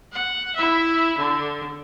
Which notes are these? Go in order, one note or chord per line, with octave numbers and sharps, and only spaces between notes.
F#5
E4 E5
D3